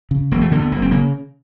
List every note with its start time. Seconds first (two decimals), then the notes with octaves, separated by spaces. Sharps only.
0.11 C#3
0.31 E1 A#3
0.41 A3
0.52 D2 D3 A#3
0.61 B3
0.72 F#1 A#3
0.82 C4
0.91 C#3 A#3